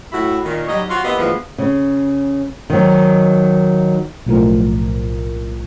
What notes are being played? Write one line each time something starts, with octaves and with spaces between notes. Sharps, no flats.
A2 E4 F#4
A#2 D#3
F#3 G3 D#4 C#5 D#5
F4 F#4
A#3 B3 E4 G4 D#5
D2 G2 E3 F3 G#3 B3
C#3
D#3 F#3
B1 A2 F3 A#4